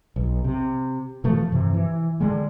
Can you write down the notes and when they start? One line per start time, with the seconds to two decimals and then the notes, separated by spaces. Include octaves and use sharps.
0.16 B1
0.44 C3
1.24 B2 E3 F3 A3
1.52 G2 C3 E3
1.74 E3
2.20 D3 G3 G#3